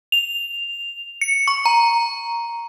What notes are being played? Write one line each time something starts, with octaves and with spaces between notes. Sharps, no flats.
F7
C#7
C#6
A#5